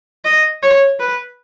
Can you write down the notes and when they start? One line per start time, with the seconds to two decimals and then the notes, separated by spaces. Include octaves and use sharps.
0.25 D#5
0.63 C#5
1.00 B4